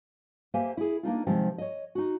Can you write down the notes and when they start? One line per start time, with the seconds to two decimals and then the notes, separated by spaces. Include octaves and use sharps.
0.54 A#3 G4 C5 E5 F5 G#5
0.77 E4 G#4
1.03 A#3 D4 D#4 F4
1.26 C3 D#3 F3 G#3 C4 G4
1.58 C#5 D#5
1.95 D#4 F#4